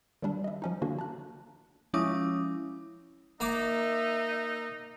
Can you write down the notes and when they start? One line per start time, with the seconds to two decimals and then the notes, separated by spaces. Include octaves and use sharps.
0.22 D#3 F#3 G3 D4
0.44 D#5 E5
0.62 F3 C#4 D#4
0.82 D3 A#3 D4 F#4
0.99 A5 A#5 F#6
1.93 F3 G#3 C#4 E4 D6 D#6
3.40 A#3 D#4 D#5 E5 D6